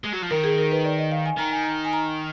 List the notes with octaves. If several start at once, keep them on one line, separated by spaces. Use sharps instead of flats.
G#3
F#3
F3
D#3 A#4
G#4
A#4
B4
D5
D#5
F5
G#5
D#3 A#5
G#5
A#5
G#5
A#5